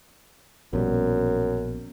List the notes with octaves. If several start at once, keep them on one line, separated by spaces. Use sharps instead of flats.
A#1 F#2 B2 G3